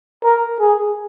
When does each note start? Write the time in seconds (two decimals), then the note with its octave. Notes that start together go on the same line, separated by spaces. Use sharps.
0.24 A#4
0.60 G#4